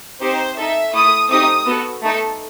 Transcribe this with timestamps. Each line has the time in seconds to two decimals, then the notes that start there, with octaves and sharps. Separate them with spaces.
0.21 C4 D#4 G4 C5
0.57 D#4 A4 E5
0.93 A3 E4 A4 D#6
1.29 A3 C4 D#4 G4 D#6
1.66 B3 F#4 A4
2.03 A3 D#4 A4